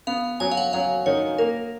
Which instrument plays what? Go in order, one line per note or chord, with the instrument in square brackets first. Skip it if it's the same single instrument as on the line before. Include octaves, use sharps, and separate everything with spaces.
[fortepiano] B3 [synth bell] F5
[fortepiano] F#3 [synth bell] G#5
[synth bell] F5
F#5
[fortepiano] F#3 [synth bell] F5
[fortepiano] D#3 [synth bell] C#5
[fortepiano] A#3 [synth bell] A#4